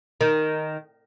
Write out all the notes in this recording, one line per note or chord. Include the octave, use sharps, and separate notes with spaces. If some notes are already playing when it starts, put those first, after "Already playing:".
D#3